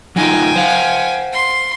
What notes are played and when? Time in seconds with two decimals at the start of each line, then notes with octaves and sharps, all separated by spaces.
0.16 F#3 D#4 F4 G5 G#5
0.56 C5 F5 F#5
1.33 C6